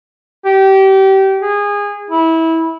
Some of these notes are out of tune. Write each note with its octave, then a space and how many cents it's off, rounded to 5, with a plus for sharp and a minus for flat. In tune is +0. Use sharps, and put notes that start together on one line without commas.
G4 -25
G#4 -25
E4 -20